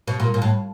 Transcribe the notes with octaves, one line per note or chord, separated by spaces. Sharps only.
B2
A#2
A#2
A2